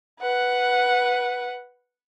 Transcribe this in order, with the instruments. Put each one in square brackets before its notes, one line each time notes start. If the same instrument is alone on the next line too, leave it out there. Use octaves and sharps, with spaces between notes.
[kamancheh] B4 F#5